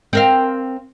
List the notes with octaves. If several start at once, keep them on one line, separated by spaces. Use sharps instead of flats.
C4 A#4 F5